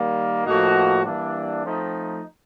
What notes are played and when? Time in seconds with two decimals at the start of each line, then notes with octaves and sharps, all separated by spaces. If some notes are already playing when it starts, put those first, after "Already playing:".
Already playing: D#3 G3 A#3
0.45 A2 F3 A#3 D#4 F#4
1.03 E3 G3 A#3 D4
1.62 F3 A3 C4 D#4